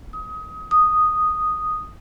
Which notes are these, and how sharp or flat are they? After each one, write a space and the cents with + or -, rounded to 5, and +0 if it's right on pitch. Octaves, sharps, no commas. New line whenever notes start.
D#6 +25
D#6 -5